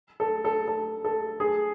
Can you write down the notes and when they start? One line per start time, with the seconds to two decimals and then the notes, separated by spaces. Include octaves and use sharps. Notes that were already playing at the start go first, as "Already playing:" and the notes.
0.20 A4
0.45 A4
0.68 A4
1.05 A4
1.40 G#4